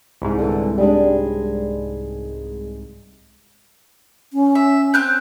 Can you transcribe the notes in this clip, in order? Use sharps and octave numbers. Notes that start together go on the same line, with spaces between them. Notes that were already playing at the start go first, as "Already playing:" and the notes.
C2 G#2
D3 E3
G3 G#3 D4
C#4
E5
C4 F#6 G6